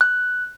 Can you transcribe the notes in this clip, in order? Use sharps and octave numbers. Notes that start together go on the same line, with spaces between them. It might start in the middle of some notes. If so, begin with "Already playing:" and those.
F#6